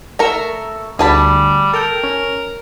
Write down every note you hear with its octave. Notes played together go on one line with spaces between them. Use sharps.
A3 A#4 A#5 C#6 E6
D2 G3 G#4 A5 B5
A4 A#4 G5
C#4